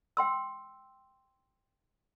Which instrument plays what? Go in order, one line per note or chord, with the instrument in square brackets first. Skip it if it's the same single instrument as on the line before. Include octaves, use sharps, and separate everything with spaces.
[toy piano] G5 C6 E6